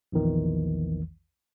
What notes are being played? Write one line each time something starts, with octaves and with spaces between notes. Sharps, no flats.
A#1 E2 D#3 E3